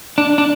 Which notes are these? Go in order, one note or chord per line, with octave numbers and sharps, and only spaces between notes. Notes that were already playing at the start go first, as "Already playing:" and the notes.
D4
D4